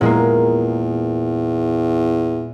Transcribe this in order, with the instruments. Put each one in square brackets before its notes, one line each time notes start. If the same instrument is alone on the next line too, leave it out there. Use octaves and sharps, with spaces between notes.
[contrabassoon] E2 [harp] A#2 G#3 A#3